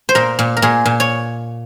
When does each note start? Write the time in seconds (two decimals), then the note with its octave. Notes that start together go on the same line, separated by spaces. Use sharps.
0.09 C5
0.15 A#2 A#4
0.39 A#2
0.57 A#4
0.62 A#2 G#4
0.85 A#2
1.00 C#5